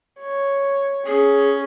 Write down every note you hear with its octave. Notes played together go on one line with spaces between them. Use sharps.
C#5
C#4 G#4